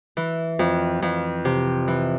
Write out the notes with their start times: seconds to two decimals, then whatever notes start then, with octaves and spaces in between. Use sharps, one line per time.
0.17 E3
0.59 F2
1.02 F2
1.45 C3
1.88 E3